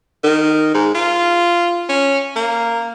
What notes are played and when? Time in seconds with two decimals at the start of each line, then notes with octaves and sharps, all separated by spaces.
0.24 D#3
0.74 G#2
0.95 F4
1.89 C#4
2.36 A#3